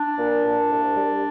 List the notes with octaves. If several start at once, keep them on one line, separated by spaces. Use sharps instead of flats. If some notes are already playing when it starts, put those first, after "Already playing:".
Already playing: D4
A#2
A#2
C2
G3